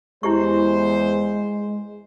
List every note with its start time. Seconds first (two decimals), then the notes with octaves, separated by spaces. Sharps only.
0.23 E2 G#3 E4 G4 C5 C#6